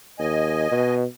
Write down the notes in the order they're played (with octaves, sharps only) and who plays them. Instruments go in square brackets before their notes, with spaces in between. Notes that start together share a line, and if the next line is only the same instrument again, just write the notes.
[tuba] D#2 [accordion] D#5 G#5
[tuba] B2